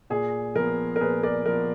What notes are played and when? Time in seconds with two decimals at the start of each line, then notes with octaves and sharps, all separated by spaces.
0.10 A#2 G#4
0.56 F3 B3 A#4
0.96 A#4
1.01 A#2 G#4 B4
1.23 A#4 D5
1.46 F3 B3 A#4